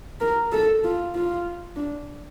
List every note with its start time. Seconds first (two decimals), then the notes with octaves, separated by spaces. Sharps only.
0.21 A#4
0.52 A4
0.84 F4
1.15 F4
1.76 D4